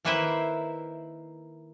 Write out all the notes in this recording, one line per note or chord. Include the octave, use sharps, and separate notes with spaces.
D#3 A#3 E4 B4 C5 E5